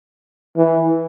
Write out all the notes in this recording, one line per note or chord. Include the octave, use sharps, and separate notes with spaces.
E3